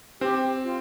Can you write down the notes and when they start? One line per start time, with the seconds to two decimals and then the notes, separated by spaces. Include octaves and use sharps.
0.20 C4 G4
0.63 F4